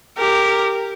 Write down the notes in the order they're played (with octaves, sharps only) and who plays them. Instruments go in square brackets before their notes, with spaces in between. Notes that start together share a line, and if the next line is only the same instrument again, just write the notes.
[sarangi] G4 [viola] A#4